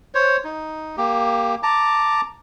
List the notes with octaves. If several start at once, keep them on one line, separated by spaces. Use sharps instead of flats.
C5 C#5
D#4
A#3 G4
A5 A#5 D6